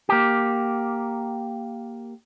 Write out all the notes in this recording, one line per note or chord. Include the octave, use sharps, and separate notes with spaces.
A#3 G4